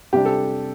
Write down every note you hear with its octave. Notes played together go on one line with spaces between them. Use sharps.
C3 G3 D4 G4
A4